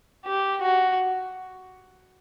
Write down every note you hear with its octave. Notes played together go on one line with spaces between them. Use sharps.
G4
F#4